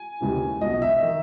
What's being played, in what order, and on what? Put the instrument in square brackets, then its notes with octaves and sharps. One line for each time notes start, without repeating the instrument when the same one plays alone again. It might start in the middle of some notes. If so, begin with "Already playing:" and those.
Already playing: [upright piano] G#5
D#2 C#3 E3
B1 B2 D#5
E5
D#3